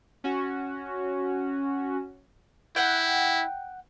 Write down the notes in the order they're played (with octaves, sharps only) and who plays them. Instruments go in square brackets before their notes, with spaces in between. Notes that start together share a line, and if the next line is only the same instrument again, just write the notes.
[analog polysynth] C#4 F#4
[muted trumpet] E4 [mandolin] F#5 G5